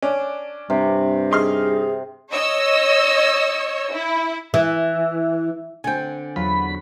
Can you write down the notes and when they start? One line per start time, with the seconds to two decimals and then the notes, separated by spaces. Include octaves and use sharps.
0.02 C#4 D4
0.70 G2 C3
1.31 D#4 G#4 C6 F6
2.31 C#5 D#5 E6
3.94 E4
4.54 E3
5.84 D3 C4 G5 G#5
6.36 E2 F#3 F4 B5